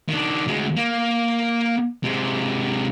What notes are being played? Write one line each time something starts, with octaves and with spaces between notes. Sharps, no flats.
D#3 D4
D2 G#3
A#3
C3 G#3